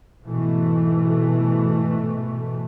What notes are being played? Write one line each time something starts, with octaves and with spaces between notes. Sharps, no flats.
G#2 B2 E3 A3